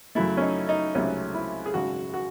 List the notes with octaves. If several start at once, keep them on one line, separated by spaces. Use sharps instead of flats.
F#2 C#3 F#3 A3 E4
C#4
D#4
D#4
C#2 C3 F#3 A3 C#4
E4
G#4
G#1 F#2 C#3 G#3 F#4
F#4